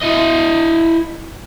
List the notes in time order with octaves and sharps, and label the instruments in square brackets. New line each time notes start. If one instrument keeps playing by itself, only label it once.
[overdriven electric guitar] E4 D#5